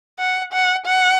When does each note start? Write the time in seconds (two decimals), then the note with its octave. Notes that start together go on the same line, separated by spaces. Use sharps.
0.19 F#5
0.53 F#5
0.86 F#5